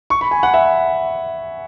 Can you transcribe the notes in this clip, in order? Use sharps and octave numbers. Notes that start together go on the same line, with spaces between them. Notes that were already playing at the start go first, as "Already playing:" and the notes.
C#6
B5
G#5
F#5
E5